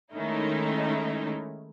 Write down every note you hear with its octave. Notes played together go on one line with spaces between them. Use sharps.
D#3 G#3 A3 C#4 D#4 E4